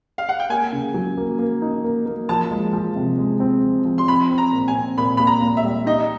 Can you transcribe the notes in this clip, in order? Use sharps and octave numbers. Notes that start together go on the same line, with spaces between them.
F5
F#5
G5
A#3 G#5
C#3
F#3
A#3
A#3
D#4
A#3
A#3
F3 A5
G#3
F3
C3
G#3
C4
F3
F3
C6
C4 B5
C4
A#5
A#2
G#5
C4
A#2 B5
A#2 B5
A#5
A#2
E5
G3
D#4 D#5